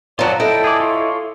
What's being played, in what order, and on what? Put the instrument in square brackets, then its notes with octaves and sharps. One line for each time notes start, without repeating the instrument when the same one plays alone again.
[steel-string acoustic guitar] F2 F#3 [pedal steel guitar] F4 A4 F#5 [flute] D5
[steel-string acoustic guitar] E4 D#5 [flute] A4 [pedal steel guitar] G5
[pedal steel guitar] G#4 D5
F4 C#5 C6